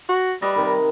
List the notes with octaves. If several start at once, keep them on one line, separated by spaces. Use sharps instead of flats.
F#4
G3 B4 D#5
C3 D#3